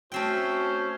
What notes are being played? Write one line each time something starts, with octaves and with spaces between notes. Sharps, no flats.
A3 C4 C#4 F#4 C5 G5